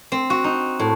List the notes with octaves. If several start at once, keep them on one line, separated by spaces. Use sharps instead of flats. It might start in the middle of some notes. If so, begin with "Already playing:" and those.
C4
F#4
D#4
A2